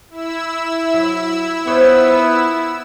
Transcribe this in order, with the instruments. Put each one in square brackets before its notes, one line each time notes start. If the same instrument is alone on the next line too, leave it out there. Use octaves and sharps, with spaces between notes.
[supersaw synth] E4 E6
[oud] F#3
[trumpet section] B3 [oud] F4 C5 C#5